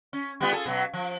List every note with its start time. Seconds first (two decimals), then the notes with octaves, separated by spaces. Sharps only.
0.13 C#4
0.40 G3 B3 F4
0.52 F4 G#4 A4
0.66 B2 F#3
0.93 F3